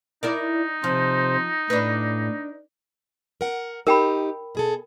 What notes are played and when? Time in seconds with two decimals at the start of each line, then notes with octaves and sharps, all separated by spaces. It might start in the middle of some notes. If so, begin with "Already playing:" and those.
0.23 D#4 E4 A#4 D5
0.84 C3 F3 C5
1.70 A2 D4 B4
3.41 A#4 F#5
3.87 D#4 G4 A#4 G5 B5
4.55 B2 G#4 A4